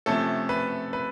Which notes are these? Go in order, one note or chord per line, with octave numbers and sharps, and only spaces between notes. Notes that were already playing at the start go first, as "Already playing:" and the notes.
C3 F3 A3 C#4 A4
B4
B4